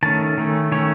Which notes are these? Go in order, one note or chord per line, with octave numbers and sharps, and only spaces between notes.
D#3 A3 C#4 A5
D#3 A3 C#4
D#3 A3 C#4 C#5